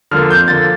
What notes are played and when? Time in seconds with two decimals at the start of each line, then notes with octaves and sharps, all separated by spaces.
0.11 D3 F3 A#3 F6
0.30 F2 G6
0.48 D3 F3 A#3 A6